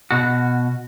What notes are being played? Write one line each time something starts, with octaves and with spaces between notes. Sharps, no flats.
B2 F#4